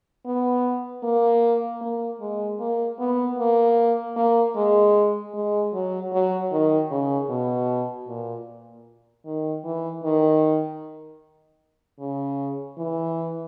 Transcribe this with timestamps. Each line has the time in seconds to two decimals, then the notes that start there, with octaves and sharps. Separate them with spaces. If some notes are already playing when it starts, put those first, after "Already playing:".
0.26 B3
1.03 A#3
1.81 A#3
2.21 G#3
2.60 A#3
2.99 B3
3.39 A#3
4.17 A#3
4.56 G#3
5.34 G#3
5.73 F#3
6.13 F#3
6.52 D#3
6.91 C#3
7.29 B2
8.08 A#2
9.26 D#3
9.64 E3
10.04 D#3
11.99 C#3
12.77 E3